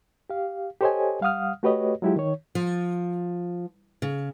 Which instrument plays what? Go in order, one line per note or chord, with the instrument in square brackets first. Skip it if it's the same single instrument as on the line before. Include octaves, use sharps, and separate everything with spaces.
[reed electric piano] G4 F5
G4 A4 C5 C#5 D#5 G#5
G3 F5 F#5 D#6 F6
A3 F#4 G4 B4 C#5 D#5
F#3 G#3 E4 F4 G4
D#3 C#5
[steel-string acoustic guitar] F3
C#3